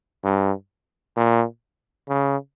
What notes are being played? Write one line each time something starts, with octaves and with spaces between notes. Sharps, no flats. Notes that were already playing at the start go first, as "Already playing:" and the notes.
G2
A#2
C#3